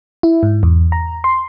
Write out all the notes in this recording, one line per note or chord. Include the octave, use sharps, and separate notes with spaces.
E4
G#2
E2
A#5
C6